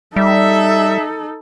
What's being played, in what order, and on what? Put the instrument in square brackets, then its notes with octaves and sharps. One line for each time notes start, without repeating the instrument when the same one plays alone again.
[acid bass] G3 [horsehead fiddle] D#4 A4 [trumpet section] E5